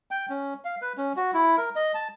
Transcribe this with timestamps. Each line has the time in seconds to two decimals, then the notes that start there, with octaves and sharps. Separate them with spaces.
0.11 G5
0.30 C#4
0.65 F5
0.82 B4
0.98 C#4
1.17 F#4
1.34 E4
1.58 A#4
1.76 D#5
1.94 A5